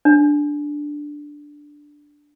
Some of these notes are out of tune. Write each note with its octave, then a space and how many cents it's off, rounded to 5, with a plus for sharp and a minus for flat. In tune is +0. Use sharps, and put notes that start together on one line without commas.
D4 +0